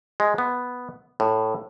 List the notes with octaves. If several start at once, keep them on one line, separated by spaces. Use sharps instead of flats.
G#3
B3
A2